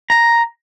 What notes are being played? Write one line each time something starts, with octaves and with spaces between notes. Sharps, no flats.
A#5